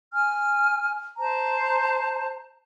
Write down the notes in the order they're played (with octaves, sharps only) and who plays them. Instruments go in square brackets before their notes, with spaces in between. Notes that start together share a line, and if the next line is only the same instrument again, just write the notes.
[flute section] G#5 F6
C5 A5 A#5